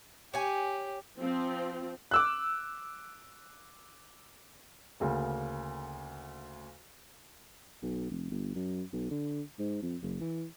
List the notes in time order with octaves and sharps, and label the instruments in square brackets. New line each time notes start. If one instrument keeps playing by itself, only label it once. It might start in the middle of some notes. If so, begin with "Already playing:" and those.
[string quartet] G4 [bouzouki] C#5 G#5
[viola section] F3 C4
[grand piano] D6 E6 F#6
[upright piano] D2 C#3 A#3
[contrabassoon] B1
F1
G1
F#2
B1
D3
G#2
F2
F#1
E3